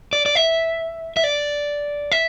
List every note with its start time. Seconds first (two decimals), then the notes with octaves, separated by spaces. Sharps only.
0.13 D5
0.26 D5
0.35 E5
1.17 E5
1.24 D5
2.12 E5